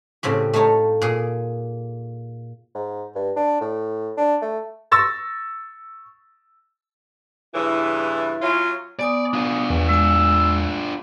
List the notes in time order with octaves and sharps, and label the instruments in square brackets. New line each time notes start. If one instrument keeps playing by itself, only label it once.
[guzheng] A2 C#3 C4 G4
A3 D#4 F4 C#5 A5
A#2 G#4
[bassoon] G#2
G2
D4
A2
D4
A3
[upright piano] C#6 E6 A6 A#6
[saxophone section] G2 C#3 E3 [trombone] E4
[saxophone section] F#3 C#4 F4
[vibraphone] B3 G#5 D#6 [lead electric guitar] D5
[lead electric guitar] D4 F4
[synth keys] E2
[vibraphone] G#3 G#5 [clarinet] E6